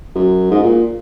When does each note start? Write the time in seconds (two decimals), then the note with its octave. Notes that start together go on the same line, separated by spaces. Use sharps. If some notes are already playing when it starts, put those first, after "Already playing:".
0.15 F#2
0.51 G#2
0.63 A#2